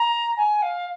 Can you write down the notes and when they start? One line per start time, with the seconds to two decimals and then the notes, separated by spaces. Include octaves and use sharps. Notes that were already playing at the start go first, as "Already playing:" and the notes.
Already playing: A#5
0.37 G#5
0.62 F5